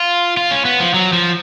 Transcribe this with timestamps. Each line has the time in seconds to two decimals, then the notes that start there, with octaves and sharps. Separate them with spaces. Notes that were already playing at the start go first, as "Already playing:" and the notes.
Already playing: F4
0.37 F4
0.51 C#4
0.65 B3
0.80 F3
0.94 F#3
1.13 F3